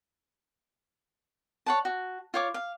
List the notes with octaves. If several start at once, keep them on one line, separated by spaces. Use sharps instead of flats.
C#5 F#5 A5
F#4
F4 C#5 D6
F5